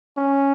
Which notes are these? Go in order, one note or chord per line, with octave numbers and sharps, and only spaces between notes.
C#4